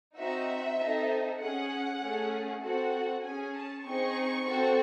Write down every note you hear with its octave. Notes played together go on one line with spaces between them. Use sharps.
C4 D#4 F#4 E5
C4 D#4 A4
C#4 G#4 F#5
A3 C#4 G#4
C4 F#4 A4 F#5
C#4 G#4 G#5
A5
C4 D#4 G#4 C#6
C4 F#4 A4